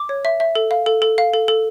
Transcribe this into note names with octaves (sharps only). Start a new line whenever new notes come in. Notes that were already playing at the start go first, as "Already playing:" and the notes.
Already playing: D6
C#5
E5
E5
A4
F5
A4
A4
F5
A4
A4